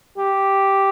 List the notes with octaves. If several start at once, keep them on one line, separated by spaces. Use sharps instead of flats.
G4